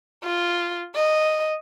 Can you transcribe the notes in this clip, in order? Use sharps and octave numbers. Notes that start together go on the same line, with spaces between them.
F4
D#5